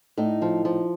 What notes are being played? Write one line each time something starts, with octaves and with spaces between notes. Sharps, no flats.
A2 D#4
F3
F3